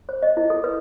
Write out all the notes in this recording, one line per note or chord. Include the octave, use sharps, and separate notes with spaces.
C5
D#5
E4
A4
B4